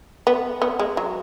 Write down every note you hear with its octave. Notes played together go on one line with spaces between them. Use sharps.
B3
B3
G#3
F#3